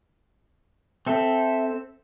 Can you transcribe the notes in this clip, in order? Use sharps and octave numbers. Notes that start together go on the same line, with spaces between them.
C4 A4 E5